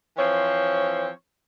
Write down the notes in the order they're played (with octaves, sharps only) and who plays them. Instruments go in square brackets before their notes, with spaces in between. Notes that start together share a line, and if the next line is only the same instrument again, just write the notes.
[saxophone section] E3 F3 C4 C#5